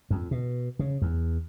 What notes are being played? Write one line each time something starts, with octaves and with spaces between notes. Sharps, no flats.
F2
B2
C#3
E2